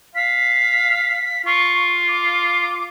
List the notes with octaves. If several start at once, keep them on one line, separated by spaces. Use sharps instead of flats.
F5 B6
F4 C#6
D6